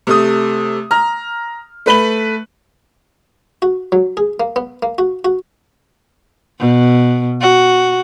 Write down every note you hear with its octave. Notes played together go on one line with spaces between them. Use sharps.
C3 A3 D#6
A#5 F6
A3 B4 B5 F#7
F#4
F#3
G#4
A#3
B3
A#3
F#4
F#4
B2
F#4